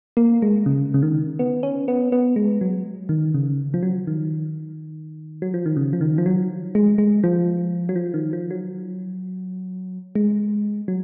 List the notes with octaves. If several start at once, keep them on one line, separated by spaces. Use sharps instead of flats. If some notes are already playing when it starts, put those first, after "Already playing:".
A#3
G#3
C#3
C#3
D#3
B3
C#4
B3
B3
G#3
F#3
D#3
C#3
F3
F#3
D#3
F#3
F3
D#3
C#3
F3
D#3
F3
F#3
G#3
G#3
F3
F#3
F3
D#3
F3
F#3
G#3
F#3